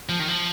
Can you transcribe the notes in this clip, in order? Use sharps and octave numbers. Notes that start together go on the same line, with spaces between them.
F3
D#3
F3